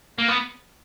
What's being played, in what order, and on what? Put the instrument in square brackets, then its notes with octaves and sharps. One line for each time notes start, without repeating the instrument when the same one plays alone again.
[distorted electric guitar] A#3
B3